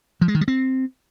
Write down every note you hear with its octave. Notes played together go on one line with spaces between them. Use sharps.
F3
G#3
D#3
G3
C4